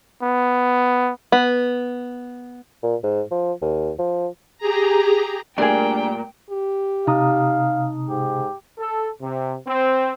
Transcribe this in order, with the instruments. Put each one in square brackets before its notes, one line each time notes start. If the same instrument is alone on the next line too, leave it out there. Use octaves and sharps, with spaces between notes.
[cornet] B3
[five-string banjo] B3
[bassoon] A#2
G#2
F3
D#2
F3
[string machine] G4 G#4 A#5
[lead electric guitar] A#2 [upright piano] G3 A3 A#4 [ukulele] D4 G#4 [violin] G5
[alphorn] G4
[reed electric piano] C3 A#5 D#6 [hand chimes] D#4 [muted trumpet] F5
[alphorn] G#2 [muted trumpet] G4
[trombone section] A4
C3
C4